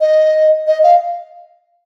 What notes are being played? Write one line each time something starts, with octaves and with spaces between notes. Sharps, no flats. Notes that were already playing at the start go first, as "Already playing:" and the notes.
D#5
D#5
F5